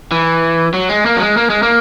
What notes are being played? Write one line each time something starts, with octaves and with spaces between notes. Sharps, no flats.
E3
F#3
G#3
A#3
F#3
G#3
A#3
G#3
A#3